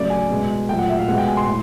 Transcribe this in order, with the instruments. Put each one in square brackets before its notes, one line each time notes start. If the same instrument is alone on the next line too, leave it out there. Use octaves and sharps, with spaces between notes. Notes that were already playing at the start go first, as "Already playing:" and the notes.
Already playing: [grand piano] C#3 F#3 A3 D5
G#5
B2 G#3
A#2 F#3 A3 G5
F#5
E5
F5
B2 G#3 F#5
G5
G#5
C6
A2